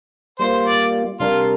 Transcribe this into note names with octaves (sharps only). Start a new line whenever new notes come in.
G3 A#3 F4 C5
D5
C3 G3 D4 F4 A#4